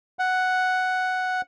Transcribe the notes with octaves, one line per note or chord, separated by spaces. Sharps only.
F#5